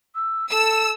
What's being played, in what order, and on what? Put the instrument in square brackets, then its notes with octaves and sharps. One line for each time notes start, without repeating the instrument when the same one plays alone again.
[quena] E6
[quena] A4 [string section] E6